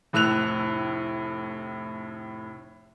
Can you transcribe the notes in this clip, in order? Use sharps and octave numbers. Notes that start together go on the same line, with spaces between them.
F1 A2 E6 F#6 F7